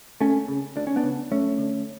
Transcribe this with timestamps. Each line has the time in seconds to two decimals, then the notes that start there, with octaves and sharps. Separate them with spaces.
0.21 D2 A3 C#4
0.48 C#3
0.76 D2 D4
0.87 C#4
0.96 B3 D4
1.03 C#3
1.31 F#2 A3 C#4
1.58 D3